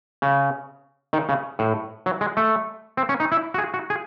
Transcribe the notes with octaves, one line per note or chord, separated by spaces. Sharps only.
C#3
D#3
C#3
A2
F#3
G#3
A3
C4
C#4
D#4
E4
F#4
G#4
F#4
G#4